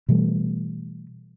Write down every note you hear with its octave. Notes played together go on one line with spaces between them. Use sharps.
B2 E3 G3 A3